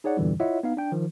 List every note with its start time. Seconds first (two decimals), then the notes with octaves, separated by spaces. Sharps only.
0.04 D#4 G#4 C#5 D5 F#5
0.17 E2 G2 A#2 D3 E3 G3
0.40 E4 F4 C#5 D#5 E5 F#5
0.63 B3 D#4 F5
0.77 D4 G5
0.92 D#3 F3